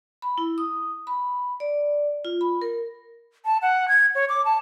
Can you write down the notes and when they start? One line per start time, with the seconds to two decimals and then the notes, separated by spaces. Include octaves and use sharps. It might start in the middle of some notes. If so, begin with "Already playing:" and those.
0.22 B5
0.38 E4
0.58 D#6
1.07 B5
1.60 D5
2.25 F4
2.41 B5
2.62 A#4
3.45 A5
3.62 F#5
3.88 G#6
4.15 C#5
4.29 D6
4.45 A5